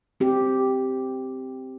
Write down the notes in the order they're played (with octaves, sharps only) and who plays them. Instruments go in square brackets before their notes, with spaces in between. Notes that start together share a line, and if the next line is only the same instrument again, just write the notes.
[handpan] C4 G4